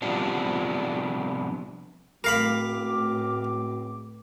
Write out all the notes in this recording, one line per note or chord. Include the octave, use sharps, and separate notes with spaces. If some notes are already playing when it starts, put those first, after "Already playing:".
C3 F3 G3 B3 D4
C#2 A2 C4 F#4 A#4 F5 B5 D6